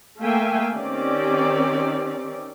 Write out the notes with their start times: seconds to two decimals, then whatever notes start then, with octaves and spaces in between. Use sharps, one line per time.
0.21 A3 A#3 E5 F5 G5 G#5
0.73 D#3 C4 C#4 G4 D5